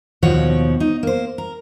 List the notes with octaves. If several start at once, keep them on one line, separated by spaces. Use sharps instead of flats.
D#2 B2 F3 F#4 C#5
D#4
A#3 C5
A#4